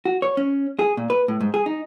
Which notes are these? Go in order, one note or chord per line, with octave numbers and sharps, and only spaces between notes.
F#4
C#5
C#4
G#4
A#2
B4
A2
G#2
G#4
D#4